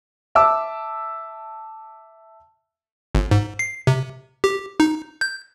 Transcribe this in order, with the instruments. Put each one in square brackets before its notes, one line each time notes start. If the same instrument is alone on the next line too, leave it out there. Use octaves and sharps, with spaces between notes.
[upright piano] E5 A5 D6 E6
[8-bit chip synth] G1
G#2
C7
C3
G4
D#4
G6